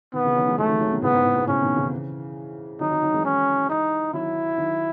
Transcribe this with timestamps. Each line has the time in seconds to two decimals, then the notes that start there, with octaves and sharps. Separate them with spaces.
0.13 B2 D#3 B3
0.25 C#3 E3
0.36 D#3 F#3
0.47 E3 G#3
0.58 D#3 F#3 A3
0.69 D#3 F#3
0.80 D#3 F#3
0.91 B2 D#3
1.02 A2 C#3 B3
1.14 G#2
1.24 A2
1.35 G#2 B2
1.47 A2 C#3 C#4
1.62 B2 D#3
1.76 C#3 E3
2.80 D#3 F#3 D#4
2.91 D#3 F#3
3.03 D#3 F#3
3.14 E3 G#3
3.25 C#4
3.69 D#4
4.13 D#3 F#3 E4
4.58 D#3 F#3